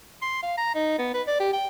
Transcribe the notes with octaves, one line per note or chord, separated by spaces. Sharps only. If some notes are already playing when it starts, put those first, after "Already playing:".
C6
F5
A#5
D#4
B3
B4
D5
G4
G5